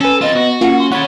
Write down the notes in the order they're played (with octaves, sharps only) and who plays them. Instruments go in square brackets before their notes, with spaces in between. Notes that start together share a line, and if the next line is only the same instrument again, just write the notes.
[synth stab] C#4 B4 [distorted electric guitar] A4 [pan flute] G#5
[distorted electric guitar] C4 F4 [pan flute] D#5 [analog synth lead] A6
[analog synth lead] B3 [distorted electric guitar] F#4
[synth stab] A#3 F4 [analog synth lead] C#4 [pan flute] F#5
[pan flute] C6
[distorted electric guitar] C#4 B5 [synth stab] F#5 G#6 A6 [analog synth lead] C#6